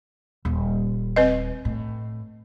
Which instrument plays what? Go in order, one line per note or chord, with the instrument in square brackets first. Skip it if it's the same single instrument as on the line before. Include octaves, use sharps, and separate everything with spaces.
[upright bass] D#1
[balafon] C4 B4 D#5
[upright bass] A2